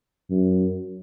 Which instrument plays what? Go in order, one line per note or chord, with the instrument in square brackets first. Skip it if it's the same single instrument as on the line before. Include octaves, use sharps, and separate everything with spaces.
[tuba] F#2